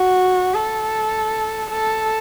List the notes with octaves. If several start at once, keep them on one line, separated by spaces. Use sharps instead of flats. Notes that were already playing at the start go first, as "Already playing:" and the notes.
Already playing: F#4
A4
A4